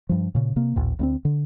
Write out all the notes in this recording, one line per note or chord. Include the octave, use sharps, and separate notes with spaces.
G2 F3
A#2 C#3
C3 A#3
A1 D#2 A#2
D2 B3 C4
D3